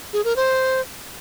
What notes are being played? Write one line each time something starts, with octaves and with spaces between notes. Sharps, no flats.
G#4
A#4
C5